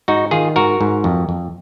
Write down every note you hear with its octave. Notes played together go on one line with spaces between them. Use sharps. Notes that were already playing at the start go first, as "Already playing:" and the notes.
G#2 D#4 F#4
D#3 F4 G#4
G#2 F#4 A#4
G#2
F2
F2